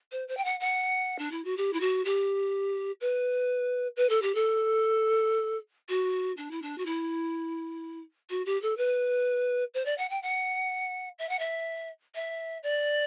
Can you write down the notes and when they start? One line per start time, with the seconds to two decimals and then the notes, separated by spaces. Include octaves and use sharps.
0.12 C5
0.28 C5
0.37 G5
0.44 F#5
0.60 F#5
1.18 D4
1.31 E4
1.44 F#4
1.57 G4
1.73 E4
1.80 F#4
2.05 G4
3.01 B4
3.96 B4
4.09 A4
4.22 G4
4.35 A4
5.89 F#4
6.37 D4
6.51 E4
6.62 D4
6.78 F#4
6.86 E4
8.30 F#4
8.46 G4
8.62 A4
8.77 B4
9.74 C5
9.85 D5
9.98 F#5
10.10 G5
10.22 F#5
11.18 E5
11.29 F#5
11.39 E5
12.15 E5
12.63 D5